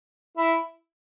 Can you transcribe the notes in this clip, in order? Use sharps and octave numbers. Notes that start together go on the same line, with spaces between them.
E4